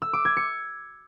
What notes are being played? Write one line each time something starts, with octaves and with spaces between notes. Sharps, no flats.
E6
D6
G#6
C#7